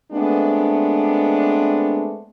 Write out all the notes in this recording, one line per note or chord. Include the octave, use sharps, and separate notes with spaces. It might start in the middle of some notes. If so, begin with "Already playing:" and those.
G#3 A3 B3 C4 D4